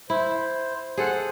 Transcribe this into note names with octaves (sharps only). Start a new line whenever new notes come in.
E4 C5
G#4 A4 C5 F#5